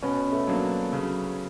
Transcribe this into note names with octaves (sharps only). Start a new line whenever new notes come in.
B2 B3 C#4
A3 B3
F#3 A#3 D4
C#3 F#3